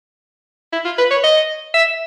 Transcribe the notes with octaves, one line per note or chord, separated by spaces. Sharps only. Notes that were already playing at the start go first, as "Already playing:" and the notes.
E4
F4
B4
C#5
D#5
E5